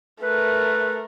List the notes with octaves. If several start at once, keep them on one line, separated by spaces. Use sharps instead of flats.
A3 A#4 B4